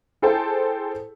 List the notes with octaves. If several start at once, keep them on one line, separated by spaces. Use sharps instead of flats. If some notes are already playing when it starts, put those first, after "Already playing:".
E4 G#4 A4 C5 G5 A5